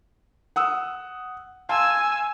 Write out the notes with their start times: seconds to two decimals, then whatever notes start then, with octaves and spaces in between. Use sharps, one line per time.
0.56 F#5 D#6 E6
1.69 F5 G#5 A5 C6 E6